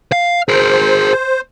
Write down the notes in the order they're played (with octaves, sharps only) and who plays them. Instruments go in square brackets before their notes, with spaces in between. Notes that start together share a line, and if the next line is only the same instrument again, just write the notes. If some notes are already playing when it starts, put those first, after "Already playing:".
[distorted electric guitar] F5
[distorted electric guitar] G#4 A#4 [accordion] C5